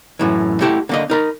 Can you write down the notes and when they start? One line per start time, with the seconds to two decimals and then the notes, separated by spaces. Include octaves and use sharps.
0.19 F#2 A2 E3
0.61 A3 E4 G4 A4 F#5
0.89 D3 A#3 D#5
1.10 D#4 A#4 B5